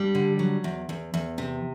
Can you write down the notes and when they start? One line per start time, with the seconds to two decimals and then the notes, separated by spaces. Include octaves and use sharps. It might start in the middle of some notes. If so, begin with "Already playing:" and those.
Already playing: G2 G3
0.15 D3
0.39 F#3
0.64 E2
0.89 E2
1.14 E2
1.38 C3